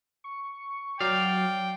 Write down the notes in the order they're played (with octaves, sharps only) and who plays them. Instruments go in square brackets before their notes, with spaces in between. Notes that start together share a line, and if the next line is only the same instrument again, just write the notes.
[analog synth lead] C#6
[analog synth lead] F#3 [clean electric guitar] D5 F5 [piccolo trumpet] G5